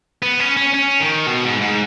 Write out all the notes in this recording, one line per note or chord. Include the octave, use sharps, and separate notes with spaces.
B3
C#4
C#4
C#4
D#3
B2
G#2
G#2